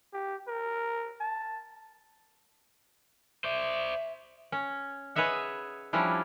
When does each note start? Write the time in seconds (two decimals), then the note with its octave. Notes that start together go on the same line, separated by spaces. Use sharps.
0.13 G4
0.47 A#4
1.20 A5
3.44 C5 D5 E5
4.52 C#4
5.15 G#4 B4 C#5 D#5 E5 F#5
5.93 F3 G3 C#4 D4 E4